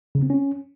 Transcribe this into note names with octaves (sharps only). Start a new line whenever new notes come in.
C#3
C4
C#4